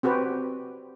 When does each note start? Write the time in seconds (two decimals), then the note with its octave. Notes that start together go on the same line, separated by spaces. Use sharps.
0.03 C4 F#4 G4 B4